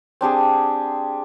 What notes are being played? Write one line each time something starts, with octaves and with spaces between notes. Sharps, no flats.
C4 D4 G4 G#4